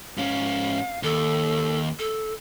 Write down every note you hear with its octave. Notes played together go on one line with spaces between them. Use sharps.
G#2 C#4 F5
D#2 A4
A4